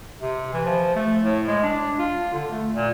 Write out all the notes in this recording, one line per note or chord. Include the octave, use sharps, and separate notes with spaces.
C3
E3
F3
A3
A2
G#3
D4
F4
D3
A3
A#2